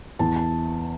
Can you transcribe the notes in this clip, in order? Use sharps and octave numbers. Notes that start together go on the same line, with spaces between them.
E2 A5
A5